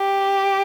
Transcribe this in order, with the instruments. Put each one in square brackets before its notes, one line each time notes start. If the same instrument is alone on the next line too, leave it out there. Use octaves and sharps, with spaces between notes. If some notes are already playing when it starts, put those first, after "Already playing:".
Already playing: [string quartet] G4